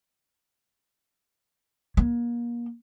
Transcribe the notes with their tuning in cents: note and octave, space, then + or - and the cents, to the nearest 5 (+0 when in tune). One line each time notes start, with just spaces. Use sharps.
A#3 +30